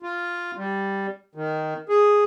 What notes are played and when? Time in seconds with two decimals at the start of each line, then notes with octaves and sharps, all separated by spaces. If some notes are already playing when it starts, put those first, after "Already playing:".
0.03 F4
0.57 G3
1.35 D#3
1.89 G#4